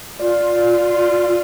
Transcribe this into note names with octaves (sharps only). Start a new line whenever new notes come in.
F4 D5
D5
D5